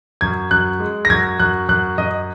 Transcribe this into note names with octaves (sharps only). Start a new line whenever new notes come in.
F#2 G#6
F#2 F#6
G#3
A#6
F#2 G#6
F#2 F#6
F#2 F#6
F#2 D#5